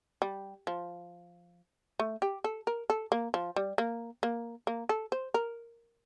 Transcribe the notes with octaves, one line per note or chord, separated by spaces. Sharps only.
G3
F3
A3
G4
A4
A#4
A4
A#3
F3
G3
A#3
A#3
A#3
A4
C5
A#4